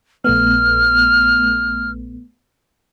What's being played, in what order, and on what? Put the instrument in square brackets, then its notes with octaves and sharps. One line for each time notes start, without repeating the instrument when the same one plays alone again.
[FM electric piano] A#1 A3 B3 [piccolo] F6